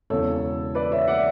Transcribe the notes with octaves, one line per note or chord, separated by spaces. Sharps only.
E1 E2 C#3 A4 C#5
B4 D5
C#5 E5
D5 F#5